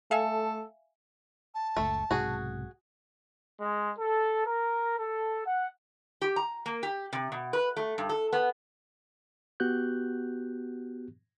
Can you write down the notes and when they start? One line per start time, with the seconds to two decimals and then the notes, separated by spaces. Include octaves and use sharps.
0.11 A3 A4 E5 F5 G#5
1.55 A5
1.77 F#1 C#2 A3 A4
2.11 B1 G#2 C3 F#4 G#4
3.60 G#3
3.98 A4
4.45 A#4
4.99 A4
5.45 F#5
6.22 G4
6.36 A#5
6.66 A#3
6.83 G4
7.13 C3
7.32 B2
7.53 B4
7.77 A3
7.98 G2
8.09 A4
8.33 B3
9.60 B3 F#4 G4 F#6 G6